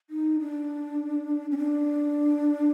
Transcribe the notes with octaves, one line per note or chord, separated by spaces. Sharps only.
D#4
D4
C#4
D4